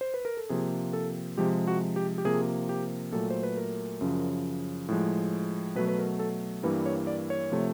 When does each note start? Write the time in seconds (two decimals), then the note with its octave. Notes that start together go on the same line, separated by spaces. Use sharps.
0.01 C5
0.14 B4
0.25 A#4
0.37 A4
0.49 C3 F3 A#3 G#4
0.93 A4
1.37 C3 F3 G#3 G4
1.68 F#4
1.96 G4
2.18 G4
2.25 C3 F3 A#3 G#4
2.69 G4
3.12 A#2 F#3 A3 A4
3.30 C5
3.43 B4
3.57 A#4
4.01 F#2 C#3 F3
4.88 A2 F3 G#3
5.76 B2 F#3 A3 B4
5.88 B4
5.99 A#4
6.19 A4
6.63 G2 E3 G3 A#3 B4
6.86 C#5
7.07 D5
7.30 C#5
7.52 C3 F3 A3